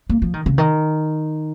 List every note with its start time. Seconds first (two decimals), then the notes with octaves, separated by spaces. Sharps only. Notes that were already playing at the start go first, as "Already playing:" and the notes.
0.10 A#3
0.22 F3
0.34 D#3
0.46 C#3
0.58 D#3